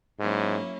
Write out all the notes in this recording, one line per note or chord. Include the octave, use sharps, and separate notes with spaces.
G#2 F#3 A#3 C#4 E4